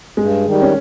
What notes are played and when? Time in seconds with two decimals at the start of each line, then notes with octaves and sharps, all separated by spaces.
0.17 G2 G#3
0.46 D#3 G3
0.62 C#4